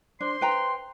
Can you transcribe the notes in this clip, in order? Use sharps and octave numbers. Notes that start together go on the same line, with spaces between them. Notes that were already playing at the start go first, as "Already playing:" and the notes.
D4 C5 C6
B4 G5 A#5